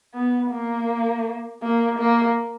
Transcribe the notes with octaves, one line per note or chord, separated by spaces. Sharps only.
B3
A#3
A#3
A#3